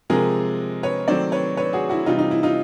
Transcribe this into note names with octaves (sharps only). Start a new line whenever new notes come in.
C3 F3 G#3 G#4 A#4
B4 C#5
D#3 F#3 A3 C4 C5 D5
B4 C#5
B4 C#5
F#4 G#4
E4 F#4
C3 E3 G3 D#4 F4
D#4
E4
D#4 F4